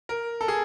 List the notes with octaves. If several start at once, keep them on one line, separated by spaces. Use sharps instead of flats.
A#4
A4
G#4